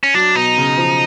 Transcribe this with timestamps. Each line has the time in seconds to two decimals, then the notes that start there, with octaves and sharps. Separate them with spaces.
0.03 C#4
0.14 F#3 D4
0.35 B2 D#4
0.58 C#3
0.78 F3